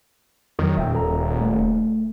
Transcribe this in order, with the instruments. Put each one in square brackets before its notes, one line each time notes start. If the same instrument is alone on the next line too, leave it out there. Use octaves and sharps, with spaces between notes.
[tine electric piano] F2 F#3 [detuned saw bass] D#3
[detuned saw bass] D#1 [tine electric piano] E5 G5
[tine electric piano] A4 A#5
A3